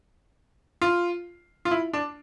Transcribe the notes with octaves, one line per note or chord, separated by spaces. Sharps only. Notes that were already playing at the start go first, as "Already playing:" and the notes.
F4
F4
E4
D4